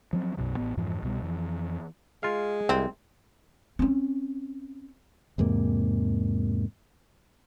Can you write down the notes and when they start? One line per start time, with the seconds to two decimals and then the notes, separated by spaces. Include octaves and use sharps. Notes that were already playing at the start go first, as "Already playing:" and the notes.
0.13 F3 F#3 C4
0.37 B1 F#2 B2 F#3
0.57 A1 A2 B3
0.77 F2 G#2 E3 F3
1.02 C2 B2 G3
1.22 F2 E3
2.23 G#3 F4 F5
2.69 C2 C4
3.79 C4 C#4
5.38 E2 G#2 C3 A#3